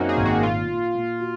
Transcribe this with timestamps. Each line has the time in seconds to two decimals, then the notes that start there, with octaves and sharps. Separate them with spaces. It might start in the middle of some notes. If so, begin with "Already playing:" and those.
Already playing: F#2 A#3 C4 C#4 D#4 F#4
0.09 G#4
0.17 G#1
0.26 F#4
0.43 A#2 F4
0.69 A#2
0.95 A#2
1.20 F#4